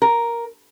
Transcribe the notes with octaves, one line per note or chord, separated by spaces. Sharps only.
A#4